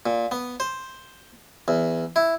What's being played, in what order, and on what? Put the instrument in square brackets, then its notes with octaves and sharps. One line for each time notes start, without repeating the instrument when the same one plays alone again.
[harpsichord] A#2
B3
C5
E2
E4